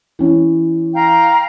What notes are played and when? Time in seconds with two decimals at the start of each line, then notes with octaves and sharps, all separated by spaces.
0.19 E3 C#4
0.93 F5 G5 A#5